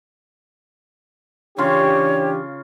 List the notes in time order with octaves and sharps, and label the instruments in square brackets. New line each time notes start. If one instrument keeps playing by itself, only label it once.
[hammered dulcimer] C#3 F4 [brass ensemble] E3 D4 G4 [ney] C#5